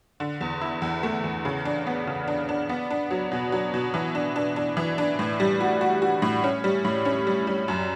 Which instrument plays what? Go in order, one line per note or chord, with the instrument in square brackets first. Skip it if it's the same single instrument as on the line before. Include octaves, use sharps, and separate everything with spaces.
[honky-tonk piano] D3
E2
E4
E2
A3
E2
C#3
D4
B3
C#3
D4
D4
B3
D4
F#3
B2
F#3
B2
E3
D4
D4
D4
E3
D4
A2
G3
F#4
F#4
F#4
A2
C#4
G3
A2
C#4
G3
G3
F#2